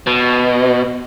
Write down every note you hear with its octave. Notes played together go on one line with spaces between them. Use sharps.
B2